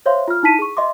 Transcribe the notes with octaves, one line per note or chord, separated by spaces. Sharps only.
C5 C#5 E5 F5 C6
F4 F6
D#4 E4 A5 B6 D#7
G#4 C#6
D#5 E5 C6 D6